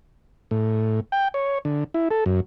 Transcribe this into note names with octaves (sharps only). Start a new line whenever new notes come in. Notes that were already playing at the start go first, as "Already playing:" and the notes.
A2
G5
C#5
D3
E4
A4
F#2